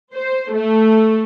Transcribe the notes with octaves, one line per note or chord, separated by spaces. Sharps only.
C5
A3